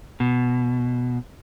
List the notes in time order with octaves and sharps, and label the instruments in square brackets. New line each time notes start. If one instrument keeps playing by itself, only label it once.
[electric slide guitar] B2